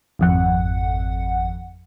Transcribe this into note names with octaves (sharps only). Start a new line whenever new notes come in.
G#1 F2 F#5